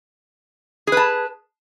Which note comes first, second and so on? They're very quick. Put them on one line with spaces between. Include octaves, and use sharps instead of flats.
G#4 B4 A5